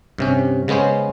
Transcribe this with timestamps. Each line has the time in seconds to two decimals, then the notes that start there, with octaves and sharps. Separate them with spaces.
0.18 G2 C3 C#4
0.68 C#3 G#3 B3 C#4 C5